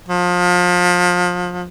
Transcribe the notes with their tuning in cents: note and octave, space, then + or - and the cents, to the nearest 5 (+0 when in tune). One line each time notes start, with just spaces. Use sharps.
F3 +30